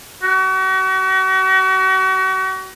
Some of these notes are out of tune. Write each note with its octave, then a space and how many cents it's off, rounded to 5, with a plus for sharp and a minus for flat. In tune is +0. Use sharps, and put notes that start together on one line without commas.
F#4 +35